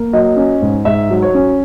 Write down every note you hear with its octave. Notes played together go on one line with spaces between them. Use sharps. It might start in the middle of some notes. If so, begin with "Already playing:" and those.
Already playing: A#3
F#3 D#5
C#4
G#2
G#2 E5
F#3
C#5
C#4